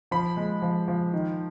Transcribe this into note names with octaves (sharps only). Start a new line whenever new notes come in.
F3 B5
G#3
F3
F3
D#3